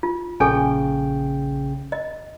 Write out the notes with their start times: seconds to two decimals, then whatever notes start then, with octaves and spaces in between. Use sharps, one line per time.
0.03 F4
0.40 A#1 C#3 G#4 A4 G5 G#5
1.92 D#5